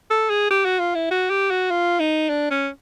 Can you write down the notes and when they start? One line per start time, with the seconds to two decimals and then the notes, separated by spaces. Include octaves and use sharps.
0.11 A4
0.30 G#4
0.51 G4
0.65 F#4
0.80 F4
0.95 E4
1.11 F#4
1.30 G4
1.51 F#4
1.71 F4
2.00 D#4
2.30 D4
2.51 C#4